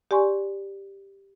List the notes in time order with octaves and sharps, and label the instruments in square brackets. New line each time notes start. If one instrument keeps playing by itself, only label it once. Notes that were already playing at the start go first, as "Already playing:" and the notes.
[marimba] G4 D5 G#5 C6 C#6